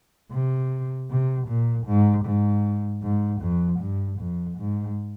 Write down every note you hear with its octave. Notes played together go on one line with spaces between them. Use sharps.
C3
C3
A#2
G#2
G#2
G#2
F2
G2
F2
G#2